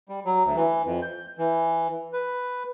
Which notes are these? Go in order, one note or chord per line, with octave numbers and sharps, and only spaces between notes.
G3
F#3
D2
E3
F2
G6
E3
B4